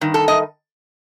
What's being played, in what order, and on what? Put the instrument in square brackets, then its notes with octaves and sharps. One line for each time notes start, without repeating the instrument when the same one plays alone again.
[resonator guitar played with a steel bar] G2 D#3
A4
D#5